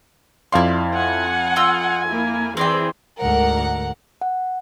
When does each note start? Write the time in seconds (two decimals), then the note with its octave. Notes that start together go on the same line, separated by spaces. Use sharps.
0.52 F2 E4 D5 F5 C6
0.95 F#5 G#5
1.56 F4 D#5 E6
2.08 A#3 E4
2.57 E3 C4 G#4 C5 D5 G5
3.21 D2 G#2 A#4 F#5
4.21 F#5